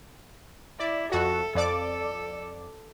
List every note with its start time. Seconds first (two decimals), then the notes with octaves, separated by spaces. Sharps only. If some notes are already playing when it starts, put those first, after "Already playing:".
0.79 E4 D5
1.12 F2 F#4 A4
1.55 F2 A4 D5 D6